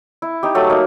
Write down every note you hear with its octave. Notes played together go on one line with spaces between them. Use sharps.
E4
D#4 G4
F#3 A3
A#3 D#4